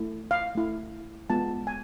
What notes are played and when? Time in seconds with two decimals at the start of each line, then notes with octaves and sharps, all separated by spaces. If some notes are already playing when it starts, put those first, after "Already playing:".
Already playing: A3 E4
0.31 F5
0.55 A3 E4
1.30 G#3 B3 F4 A5
1.67 G#5